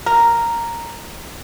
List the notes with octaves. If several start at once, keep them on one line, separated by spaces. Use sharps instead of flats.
A#4